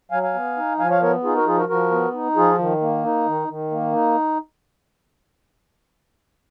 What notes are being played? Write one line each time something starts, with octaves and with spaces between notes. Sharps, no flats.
F#3 F5 G#5
F5 G#5
B3
D#4
F3 F5 G#5
C#5 F5
B3 A#4 C#5
D#4 F4 G#4
F#4 A#4
F3 F4 G#4
F#4 A#4
F3 F#4 A#4
B3
D#4
F3 F4 G#4
D#3
A#3
D#4
D#3
D#3
A#3
D#4